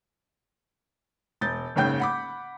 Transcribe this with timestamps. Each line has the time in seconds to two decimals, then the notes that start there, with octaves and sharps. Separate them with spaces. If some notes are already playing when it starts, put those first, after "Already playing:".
1.41 E1 G6 A6
1.76 F#1 G#2 C#3 G5 G6
2.00 F#5 B5 D6